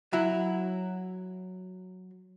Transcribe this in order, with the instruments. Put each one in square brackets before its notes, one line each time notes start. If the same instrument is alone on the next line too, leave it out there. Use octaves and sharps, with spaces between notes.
[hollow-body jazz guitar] F#3 E4